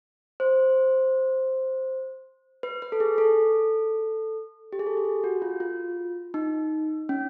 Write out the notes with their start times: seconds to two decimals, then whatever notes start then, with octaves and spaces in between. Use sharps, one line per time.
0.40 C5
2.63 B4
2.82 B4
2.92 A4
3.00 G#4
3.18 A4
4.73 G4
4.79 G#4
4.87 A4
4.97 G4
5.04 G#4
5.24 F#4
5.42 F4
5.60 F4
6.34 D#4
7.09 C#4